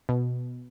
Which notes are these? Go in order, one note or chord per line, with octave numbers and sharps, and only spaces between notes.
B2